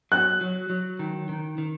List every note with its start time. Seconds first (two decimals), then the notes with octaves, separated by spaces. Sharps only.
0.12 F#3 F#6
0.41 F#3
0.70 F#3
0.99 D#3
1.29 D#3
1.58 D#3